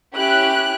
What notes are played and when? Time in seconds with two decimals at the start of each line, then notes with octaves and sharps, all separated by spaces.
0.14 C#4 E4 G4 F#6